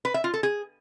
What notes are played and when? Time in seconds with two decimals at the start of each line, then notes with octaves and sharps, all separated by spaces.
0.05 B4
0.14 E5
0.24 F4
0.34 A4
0.43 G#4